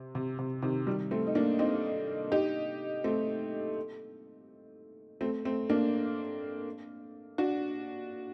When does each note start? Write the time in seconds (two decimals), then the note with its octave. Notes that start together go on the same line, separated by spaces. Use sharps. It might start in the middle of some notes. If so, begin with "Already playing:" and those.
Already playing: C3
0.15 C3
0.39 C3
0.62 C3 D#3
0.87 D#3 G3
1.11 A3 C4
1.27 D#4
1.35 A#3 D4
1.59 C4 D#4
2.32 D#4 G4
3.04 A3 C4
5.21 A3 C4
5.45 A3 C4
5.69 A#3 D4
7.38 D4 F#4